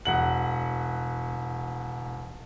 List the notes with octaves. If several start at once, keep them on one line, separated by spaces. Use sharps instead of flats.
E1 F#5 F#7